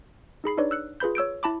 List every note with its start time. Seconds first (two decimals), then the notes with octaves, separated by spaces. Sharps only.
0.44 D#4 G#4 B5 C7
0.57 D4 D#4 B4 C#5 D5
0.71 E6 F#6 C#7
1.00 F4 G#4 B4 B5 G6
1.15 C#5 E6 G6 D7
1.43 E4 A5 B5 D6